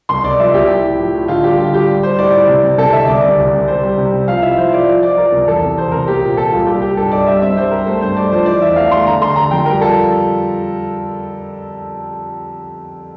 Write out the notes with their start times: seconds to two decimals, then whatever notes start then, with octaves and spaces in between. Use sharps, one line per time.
0.09 C2 C6
0.24 C2 D5
0.39 F3 E5
0.54 C2 G4
0.68 E4
0.84 A2
0.98 F3
1.14 A2
1.28 D3 F4
1.43 G3 G4
1.58 D3 F4
1.74 G3 G4
1.88 G3
2.03 G3 C5
2.19 A2 D5
2.33 E4
2.48 C3
2.64 C3
2.78 C3 A4
2.93 D2 E5
3.08 C2 D5
3.23 C3
3.39 C2
3.53 C3
3.68 G3 C5
3.83 G3
3.97 C3
4.12 C3
4.28 F3 F5
4.42 E4 E5
4.58 F3 C5
4.73 F3 D5
4.87 F3
5.03 F3 D5
5.17 F3 A#4
5.32 C2
5.47 E2 A4
5.63 C3
5.77 E2 C5
5.92 C3 A#4
6.08 A#3 G4
6.22 A#2
6.36 A#2 A4
6.52 C2 F4
6.67 G3 G4
6.82 G3 G4
6.97 G2 A4
7.11 G2 D5
7.26 G3 E5
7.41 C4 E5
7.57 G3 C5
7.71 G3 A#4
7.86 A3 C5
8.02 G2 C5
8.16 A3 D5
8.31 F3 C5
8.46 E3 D5
8.61 E2 E5
8.76 A3 F5
8.91 A3 C6
9.06 D3 A#5
9.21 D3 C6
9.36 D3 A#5
9.51 F2 G5
9.66 G3 A#4
9.81 F4 A4